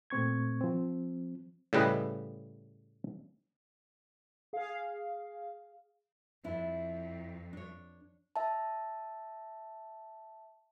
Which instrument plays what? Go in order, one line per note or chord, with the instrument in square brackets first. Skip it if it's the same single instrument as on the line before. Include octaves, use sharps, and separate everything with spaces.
[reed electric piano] A#2 A3 C4 C#6 G#6
F3 C4
[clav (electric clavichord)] A2 C#3 G3 B4 D#5
[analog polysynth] G#4 F5
[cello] F2 [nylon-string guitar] D4 E4
[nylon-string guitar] D4 C#5
[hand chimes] E5 A5